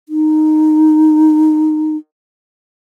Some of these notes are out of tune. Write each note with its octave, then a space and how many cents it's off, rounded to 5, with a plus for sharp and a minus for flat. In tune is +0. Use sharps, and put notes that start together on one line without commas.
D#4 -10